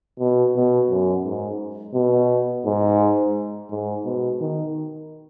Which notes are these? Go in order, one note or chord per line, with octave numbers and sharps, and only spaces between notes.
B2
B2
F#2
G#2
B2
G#2
G#2
B2
D#3